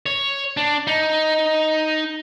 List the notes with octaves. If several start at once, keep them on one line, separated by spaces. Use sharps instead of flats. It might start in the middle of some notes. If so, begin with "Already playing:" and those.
C#5
D4
D#4